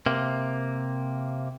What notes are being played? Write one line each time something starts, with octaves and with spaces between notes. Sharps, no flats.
C3 A#3